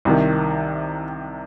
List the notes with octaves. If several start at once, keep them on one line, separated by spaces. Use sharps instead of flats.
C2 C3 D#3